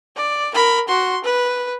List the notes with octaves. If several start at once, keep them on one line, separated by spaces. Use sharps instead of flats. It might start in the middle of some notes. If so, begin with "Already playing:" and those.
D5
A#4 B5
F#4 C6
B4